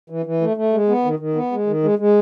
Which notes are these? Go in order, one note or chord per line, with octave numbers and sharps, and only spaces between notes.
E3
E3
A3
A3
G#3
B3
D#3
D#3
B3
G#3
D#3
G#3
G#3